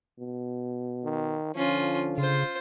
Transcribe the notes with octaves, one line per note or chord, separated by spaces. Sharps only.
B2
D#3
D3 F3 C#4 F4
C#3 F4 C5